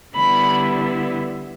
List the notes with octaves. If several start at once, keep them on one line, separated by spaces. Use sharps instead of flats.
D3 G3 B3 E4 B5